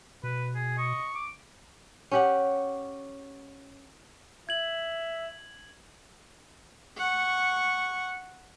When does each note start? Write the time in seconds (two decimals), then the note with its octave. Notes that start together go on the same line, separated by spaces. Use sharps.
0.23 B2 B4
0.55 G#4
0.78 D#5 C#6
1.15 D6
2.12 C#4 G4 F#5
4.49 E5 G#6 F#7
6.97 F#5 C#6